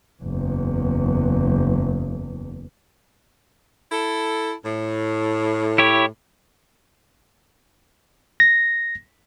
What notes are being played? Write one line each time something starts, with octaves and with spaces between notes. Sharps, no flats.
F#1 E2
E4 A4
A2
E4 G4 C#5
A#6